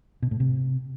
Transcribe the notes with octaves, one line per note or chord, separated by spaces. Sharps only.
B2
A2
C3